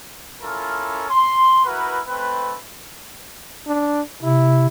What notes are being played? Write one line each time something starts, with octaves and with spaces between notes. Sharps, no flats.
C#4 E4 F4 A4 A#4
C6
E4 F#4 A#4 B4
A3 C4 B4
D4
C3 E4